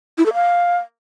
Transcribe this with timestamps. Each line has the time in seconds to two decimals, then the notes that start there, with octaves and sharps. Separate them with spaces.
0.18 E4
0.26 A4
0.34 F5